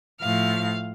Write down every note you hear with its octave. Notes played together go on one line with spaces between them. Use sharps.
A2 F3 F5